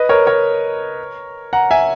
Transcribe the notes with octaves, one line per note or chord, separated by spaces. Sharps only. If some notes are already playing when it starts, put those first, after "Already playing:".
Already playing: B4 D#5
A#4 C#5
A#4 C#5
F#5 A#5
E5 G#5